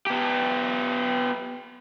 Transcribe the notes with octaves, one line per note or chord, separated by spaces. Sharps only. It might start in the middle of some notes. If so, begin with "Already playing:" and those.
B3 G4